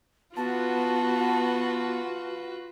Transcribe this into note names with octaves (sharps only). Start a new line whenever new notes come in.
B3 F4 F#4 B4 A5